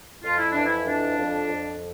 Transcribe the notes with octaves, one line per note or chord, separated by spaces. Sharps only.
F2 F4
E4
E3 D4
E4
F2 D4
F2
F2